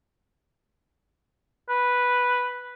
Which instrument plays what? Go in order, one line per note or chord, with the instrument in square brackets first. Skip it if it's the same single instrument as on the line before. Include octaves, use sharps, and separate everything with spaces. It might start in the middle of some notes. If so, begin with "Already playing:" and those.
[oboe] B4